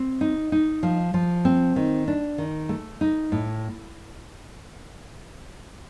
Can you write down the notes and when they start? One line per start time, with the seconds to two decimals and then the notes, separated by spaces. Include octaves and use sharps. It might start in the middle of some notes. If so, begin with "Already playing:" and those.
Already playing: C4
0.21 D#4
0.52 D#4
0.83 F3
1.14 F3
1.45 C4
1.76 D#3
2.08 D4
2.38 D#3
2.69 A3
3.01 D#4
3.32 A2